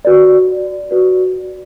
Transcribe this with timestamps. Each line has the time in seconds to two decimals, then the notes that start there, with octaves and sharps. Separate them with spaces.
0.05 F#4 B4 D5
0.91 F#4 B4 D5